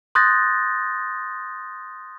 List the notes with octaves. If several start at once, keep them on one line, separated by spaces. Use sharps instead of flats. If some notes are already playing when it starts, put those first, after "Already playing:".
C6 D#6 F#6 G6 A6 A#6